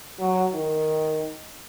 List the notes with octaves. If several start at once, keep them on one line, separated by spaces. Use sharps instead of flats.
F#3
D#3